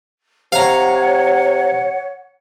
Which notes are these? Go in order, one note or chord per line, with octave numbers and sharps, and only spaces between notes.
C3 C#5 F5 F#5 A#5